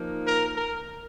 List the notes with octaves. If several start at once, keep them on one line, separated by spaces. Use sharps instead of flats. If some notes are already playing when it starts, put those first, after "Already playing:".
Already playing: F3 A#3 D#4
A#4
A#4